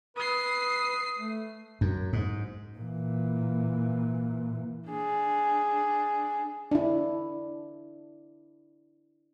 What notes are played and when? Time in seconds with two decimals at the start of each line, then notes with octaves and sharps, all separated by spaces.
0.17 B4 D#6 C7
1.19 A3
1.81 F#2
2.13 G#2
2.78 A#2 E3
4.87 D4 G#4
6.71 D4 E4